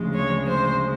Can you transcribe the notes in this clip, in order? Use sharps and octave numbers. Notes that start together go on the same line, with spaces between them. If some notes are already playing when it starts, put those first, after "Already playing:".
Already playing: D2 C#3 F3 G#3
C#5
C5